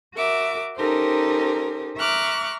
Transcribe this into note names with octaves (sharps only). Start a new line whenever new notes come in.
F#4 A#4 E5 D6
C#4 D#4 G4 A4 A#4 C5
E5 A#5 C#6 D6 F6 F#6